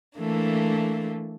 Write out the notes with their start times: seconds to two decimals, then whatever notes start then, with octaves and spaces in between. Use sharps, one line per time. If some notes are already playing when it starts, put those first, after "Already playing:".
0.19 E3 A3 A#3 D4